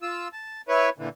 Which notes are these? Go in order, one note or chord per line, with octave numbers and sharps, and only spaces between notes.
F4 E6
A5
E4 B4 C#5
A#2 D3 E3